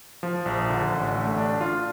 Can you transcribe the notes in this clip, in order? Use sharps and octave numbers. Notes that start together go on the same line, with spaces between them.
F3
A#1
D3
A1
A3
D4
F4